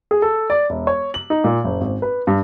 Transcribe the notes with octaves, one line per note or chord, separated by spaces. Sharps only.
G#4
A4
D5
E1
C#5
F#7
D#4
A#2
F#1
G#1
B4
G2